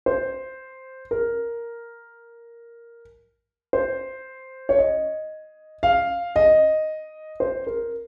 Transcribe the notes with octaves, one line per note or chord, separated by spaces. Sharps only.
C5
A#4
C5
C#5
D#5
F5
D#5
C5
A#4